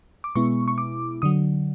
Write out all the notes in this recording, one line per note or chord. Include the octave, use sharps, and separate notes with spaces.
D6
B2 G#3 B3 E4 C#6
C#6
D6
D3 F#3 D#6